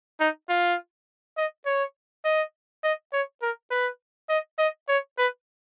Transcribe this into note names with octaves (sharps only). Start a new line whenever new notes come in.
D#4
F4
D#5
C#5
D#5
D#5
C#5
A#4
B4
D#5
D#5
C#5
B4